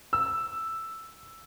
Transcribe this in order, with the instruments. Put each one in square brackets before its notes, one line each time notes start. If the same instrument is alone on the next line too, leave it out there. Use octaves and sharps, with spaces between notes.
[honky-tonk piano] E6